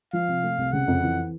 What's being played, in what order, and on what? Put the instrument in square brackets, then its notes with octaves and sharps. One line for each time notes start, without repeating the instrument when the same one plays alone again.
[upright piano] F3 [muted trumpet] F5
[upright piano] C3
A3
C2
[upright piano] C#3 [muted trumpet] F#5
[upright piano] F2
E3